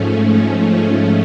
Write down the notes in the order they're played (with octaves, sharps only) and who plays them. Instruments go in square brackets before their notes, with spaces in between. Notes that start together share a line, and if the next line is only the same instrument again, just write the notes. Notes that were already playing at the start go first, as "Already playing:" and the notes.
Already playing: [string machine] G#2 F3 A3 C#4